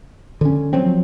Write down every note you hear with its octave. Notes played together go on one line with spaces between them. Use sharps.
D3 C#4
F3 F#3 C4